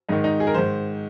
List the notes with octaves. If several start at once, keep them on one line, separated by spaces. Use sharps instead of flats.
G#2 D#3 D#4
D#4
G#4
A#4
G#2 D#3 C5